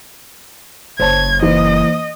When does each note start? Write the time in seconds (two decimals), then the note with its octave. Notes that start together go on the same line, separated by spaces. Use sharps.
0.99 F#1 C5 C#5 A5 G#6
1.42 E3 A#3 C5 D#5